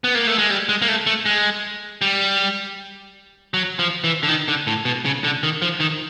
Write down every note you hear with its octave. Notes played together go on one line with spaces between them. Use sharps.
B3
A#3
A3
G#3
G3
G#3
A#3
A3
A3
G#3
G3
F#3
F3
E3
D3
D#3
D3
A2
B2
C#3
D3
D#3
F3
D#3